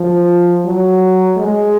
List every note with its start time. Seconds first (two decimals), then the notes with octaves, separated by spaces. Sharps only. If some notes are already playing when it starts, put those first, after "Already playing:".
Already playing: F3
0.65 F#3
1.37 G#3